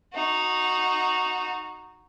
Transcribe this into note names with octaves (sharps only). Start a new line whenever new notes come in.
D#4 F#4